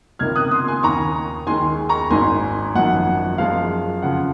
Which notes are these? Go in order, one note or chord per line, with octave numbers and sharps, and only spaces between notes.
C#2 C3 D#3 A#3 F6 G#6
D#6 F#6
C6 D#6
G#5 C6
D#2 D#3 A#3 A#5 C#6
D#2 D#3 G#3 G#5 C6
A#5 C#6
G#1 G#2 D#3 G#5 C6
G#1 F#2 F3 F#5
F#2 F3 G#3 F5
F2 C#3 F3 F#5